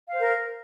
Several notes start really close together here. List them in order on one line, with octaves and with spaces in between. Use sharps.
F5 C5 A#4